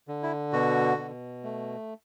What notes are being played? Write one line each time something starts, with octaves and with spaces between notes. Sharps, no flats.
D3
E4
B2 F#4
B2
A3